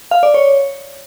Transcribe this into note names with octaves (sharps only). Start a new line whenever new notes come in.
F5
D5
C#5